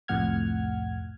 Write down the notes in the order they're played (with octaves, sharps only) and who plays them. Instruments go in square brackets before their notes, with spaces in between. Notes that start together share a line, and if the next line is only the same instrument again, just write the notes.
[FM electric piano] C2 F2 A2 F#5 F6 G#6